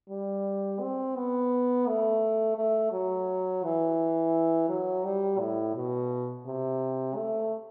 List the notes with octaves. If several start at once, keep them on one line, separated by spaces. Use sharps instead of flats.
G3
C4
B3
A3
A3
F#3
E3
F#3
G3
A2
B2
C3
A3